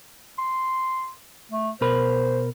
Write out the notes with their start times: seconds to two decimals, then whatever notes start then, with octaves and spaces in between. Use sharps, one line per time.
0.38 C6
1.52 A3
1.81 B2 A#4 C5 B5